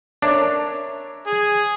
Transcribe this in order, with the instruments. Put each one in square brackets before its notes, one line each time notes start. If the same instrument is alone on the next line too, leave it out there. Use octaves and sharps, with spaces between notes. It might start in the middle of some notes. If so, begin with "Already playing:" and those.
[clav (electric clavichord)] D4 [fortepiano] A#4 C#5 E5
[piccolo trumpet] G#4